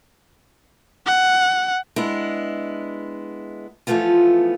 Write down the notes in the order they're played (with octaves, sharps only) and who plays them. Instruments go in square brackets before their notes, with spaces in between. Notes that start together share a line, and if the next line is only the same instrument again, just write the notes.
[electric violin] F#5
[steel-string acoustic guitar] G#3 B3 D4 E4
E3 F3 G#3 A3 B3 F4